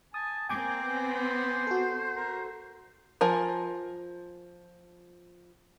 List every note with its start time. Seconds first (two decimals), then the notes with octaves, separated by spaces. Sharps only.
0.14 G#5 A5 D#6
0.49 A#3 C4 G5 G#5 D6 G#6
0.82 B3
1.16 C5
1.67 F#4 A4
2.16 A#4
3.21 F3 A#4 G#5